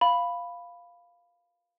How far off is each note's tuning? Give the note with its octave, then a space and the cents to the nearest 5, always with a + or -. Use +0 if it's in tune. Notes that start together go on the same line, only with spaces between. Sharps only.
F5 +0 B5 +0